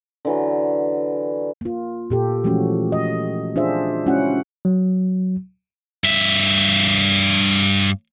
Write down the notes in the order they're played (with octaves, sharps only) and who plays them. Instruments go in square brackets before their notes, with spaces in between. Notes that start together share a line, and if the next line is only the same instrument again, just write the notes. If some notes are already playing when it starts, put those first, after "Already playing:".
[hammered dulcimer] D3 E3 F#3
[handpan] A#3 F4
A#2 G4 A4
E3 F3 G#3 A3 C#4 F#4
D#5
D4 F4 G#4 C5 E5
G#3 C#4 E4 F#4 F#5
[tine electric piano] F#3
[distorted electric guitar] G2 E5